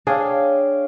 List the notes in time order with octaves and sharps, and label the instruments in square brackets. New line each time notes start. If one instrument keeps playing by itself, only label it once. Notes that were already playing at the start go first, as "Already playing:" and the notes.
[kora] D4 G#4 [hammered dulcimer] C#5 F5 G5